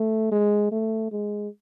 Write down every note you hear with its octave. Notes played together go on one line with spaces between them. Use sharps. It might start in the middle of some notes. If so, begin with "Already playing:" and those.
Already playing: A3
G#3
A3
G#3